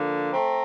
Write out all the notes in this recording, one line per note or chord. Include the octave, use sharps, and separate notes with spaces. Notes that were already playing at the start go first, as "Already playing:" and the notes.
Already playing: D3 F3 A#3
A3 C4 A#5